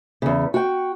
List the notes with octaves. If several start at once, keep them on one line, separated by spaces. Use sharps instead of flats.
E2 C#3
F#4 G5